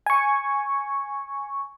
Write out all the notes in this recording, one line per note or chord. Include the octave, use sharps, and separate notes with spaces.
G#5 C#6